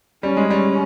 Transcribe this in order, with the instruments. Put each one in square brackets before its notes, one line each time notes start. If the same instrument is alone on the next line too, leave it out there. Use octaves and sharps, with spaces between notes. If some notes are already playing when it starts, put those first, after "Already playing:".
[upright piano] G3 [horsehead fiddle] C#4
[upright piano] G#3
[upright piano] G3 [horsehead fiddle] C#4